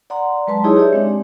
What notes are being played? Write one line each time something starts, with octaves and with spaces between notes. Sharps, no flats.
D5 F#5 A#5 C6
F#3 G#3 B4 A5 C6
D#4 E4 G4 G#4 C#5 D#5
G4 C#5 D5 E5
G#3 C4 D4